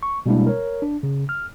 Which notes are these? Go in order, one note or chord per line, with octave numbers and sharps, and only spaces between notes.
C#6
B2 G3 G#3 A#3 D4 E4
A#4 C#5
D4
C#3
F6